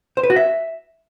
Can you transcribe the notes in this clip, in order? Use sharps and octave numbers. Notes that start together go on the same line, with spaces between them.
C5
B4
F#4
E5